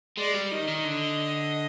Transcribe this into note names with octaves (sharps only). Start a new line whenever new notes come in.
G#3 D5
G3
D#3 D#5
D#3
D3